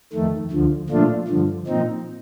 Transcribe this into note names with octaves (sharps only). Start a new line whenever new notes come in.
F2 D#3 A3
D2 D3 F3
A#2 F3 A3 D4 F4
G2 D3 F3
A#2 F3 C4 D#4